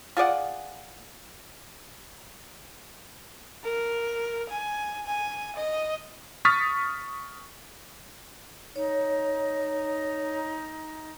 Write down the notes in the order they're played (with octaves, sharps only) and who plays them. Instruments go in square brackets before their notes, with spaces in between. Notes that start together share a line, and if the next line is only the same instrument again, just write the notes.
[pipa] F4 G#4 D5 F#5
[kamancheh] A#4
G#5
G#5
D#5
[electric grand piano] C#6 D#6 F6 A6 B6
[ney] D#4 [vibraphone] C#5